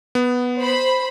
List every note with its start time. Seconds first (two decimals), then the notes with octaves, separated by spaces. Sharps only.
0.15 B3
0.59 C5 B5